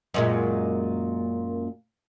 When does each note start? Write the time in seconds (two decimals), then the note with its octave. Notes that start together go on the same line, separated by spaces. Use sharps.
0.14 F#2 A#2 G#3